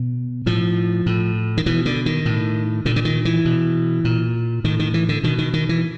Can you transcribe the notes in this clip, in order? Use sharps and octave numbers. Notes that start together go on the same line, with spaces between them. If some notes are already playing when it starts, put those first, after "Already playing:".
Already playing: B2
A2 F3
A2
D#3
B2 E3
D3
D#3
A2
A#2 D3
D3
D#3
E3
B2
A#2
A2 D#3
D#3
E3
D3
B2 D#3
D#3
D#3
E3